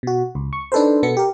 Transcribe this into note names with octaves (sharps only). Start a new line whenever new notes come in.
B2 F#4
C#2
C#6
D4 D#4 A4 B4 C5
B2 B3 A4 C#7
G4 A#4